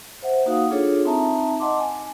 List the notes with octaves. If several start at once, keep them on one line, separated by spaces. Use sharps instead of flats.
C5 E5 F#5
A#3 D#4 F#4 F5 F#5 D#6
D4 F4 G#4 A4 C#5
C4 D#4 E5 A5 A#5
D#5 F#5 A5 C6 D6
G#5